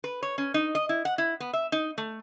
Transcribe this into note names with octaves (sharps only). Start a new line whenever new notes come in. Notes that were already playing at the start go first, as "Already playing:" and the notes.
B4
C#5
C#4
D#4
D#5
E4
F#5
E4
B3
E5
D#4
A3